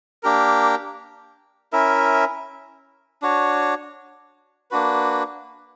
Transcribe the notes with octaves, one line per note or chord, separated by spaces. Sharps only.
A#3 D4 G4 A#4
C#4 E4 A#4 E5
D4 F#4 C#5
A#3 D4 F#4 B4